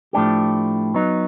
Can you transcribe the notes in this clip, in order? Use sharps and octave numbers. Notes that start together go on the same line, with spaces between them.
A2 F3 A3 D4 G4
F#3 B3 D#4